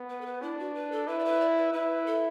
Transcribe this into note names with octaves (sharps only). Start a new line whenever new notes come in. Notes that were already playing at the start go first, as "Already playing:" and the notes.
Already playing: B3
B4
A4
B4
D4 E4
F#4
B4
A4
E4 B4
D5
B4
D5
B4
E4 B4
A4